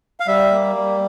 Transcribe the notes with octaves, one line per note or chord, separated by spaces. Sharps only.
F5
G3 E5
A#3
G3